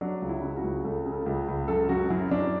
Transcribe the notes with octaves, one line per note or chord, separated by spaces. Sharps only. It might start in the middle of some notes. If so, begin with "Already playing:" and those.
F#3 D4
C#2
E4
C#3
F#4
C#2
C#2 A4
C#3
A4
C#2
C#2
F#2 A4
F#2 F#4
F#2 E4
F#2 D4